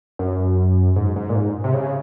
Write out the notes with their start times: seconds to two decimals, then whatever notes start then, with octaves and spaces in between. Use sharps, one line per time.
0.19 F#2
0.96 G#2
1.16 G#2
1.29 A#2
1.36 G#2
1.64 C3
1.74 C#3